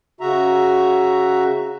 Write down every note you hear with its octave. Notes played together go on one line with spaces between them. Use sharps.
C#3 F#4 E5 A#5